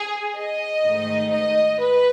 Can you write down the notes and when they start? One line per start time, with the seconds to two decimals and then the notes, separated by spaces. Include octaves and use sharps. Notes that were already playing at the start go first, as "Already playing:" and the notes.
Already playing: G#4
0.35 D#5
0.83 G#2 D#3 A3 D#4
1.32 D#5
1.80 B4